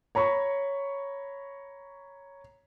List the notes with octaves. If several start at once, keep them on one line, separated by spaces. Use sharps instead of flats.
C#5 A#5 B5 C#6